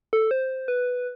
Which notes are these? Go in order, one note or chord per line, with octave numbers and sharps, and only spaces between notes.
A4
C5
B4